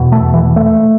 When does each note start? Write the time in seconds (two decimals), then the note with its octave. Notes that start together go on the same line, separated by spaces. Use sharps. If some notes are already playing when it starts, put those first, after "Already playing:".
Already playing: E2 B2
0.12 A3
0.34 E3
0.56 A3